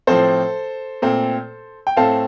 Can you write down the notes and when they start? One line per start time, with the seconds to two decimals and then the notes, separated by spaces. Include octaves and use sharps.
0.07 A2 F3 C4 A4 C5
1.02 A#2 A3 C4
1.87 G5
1.97 A2 A3 C4 F5 A5